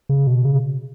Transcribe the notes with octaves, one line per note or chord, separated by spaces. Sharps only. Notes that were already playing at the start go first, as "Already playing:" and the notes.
C#3
B2
C#3